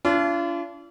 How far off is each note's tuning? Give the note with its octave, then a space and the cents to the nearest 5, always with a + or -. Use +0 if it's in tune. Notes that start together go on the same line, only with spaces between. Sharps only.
D4 -35 F4 -40